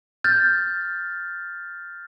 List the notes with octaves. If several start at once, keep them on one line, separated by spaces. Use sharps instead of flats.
F6 G6 A6